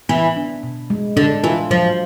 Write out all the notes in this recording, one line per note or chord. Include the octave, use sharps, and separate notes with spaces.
E3 B3
D4
B2
G#3
D3 D4
E3 F4
F3 F#3